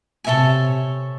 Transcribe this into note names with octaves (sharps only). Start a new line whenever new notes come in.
C3 A4 C#5 E5 G#5